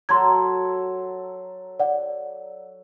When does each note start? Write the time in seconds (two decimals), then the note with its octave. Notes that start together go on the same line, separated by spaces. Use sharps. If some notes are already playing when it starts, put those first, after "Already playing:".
0.09 F#3 A4 C6 G#6
1.79 D5 F#5